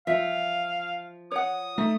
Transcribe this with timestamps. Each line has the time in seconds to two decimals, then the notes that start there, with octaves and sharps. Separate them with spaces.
0.07 F3 F4 E5 F5
1.31 C#5 F#5 D#6
1.78 A3 D#4